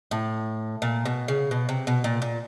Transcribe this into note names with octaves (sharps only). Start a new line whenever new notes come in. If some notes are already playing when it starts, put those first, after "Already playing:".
A2
A#2
B2
C#3
B2
C3
B2
A#2
A#2